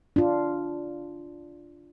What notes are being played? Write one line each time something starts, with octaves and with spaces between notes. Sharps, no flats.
D4 F4